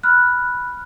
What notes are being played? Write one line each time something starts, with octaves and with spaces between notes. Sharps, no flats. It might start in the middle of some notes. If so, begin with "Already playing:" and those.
B5 F6 F#6